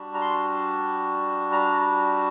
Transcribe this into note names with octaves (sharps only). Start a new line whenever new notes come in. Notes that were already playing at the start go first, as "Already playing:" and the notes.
Already playing: G3 D4 F#4
A#5
C6
A#5